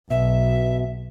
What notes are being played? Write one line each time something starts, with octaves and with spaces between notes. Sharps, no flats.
B1 B2 E5